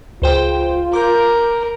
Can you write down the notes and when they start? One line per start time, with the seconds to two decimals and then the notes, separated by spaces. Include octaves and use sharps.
0.22 C#2 F4 C5 G5
0.93 A#4 D6 G6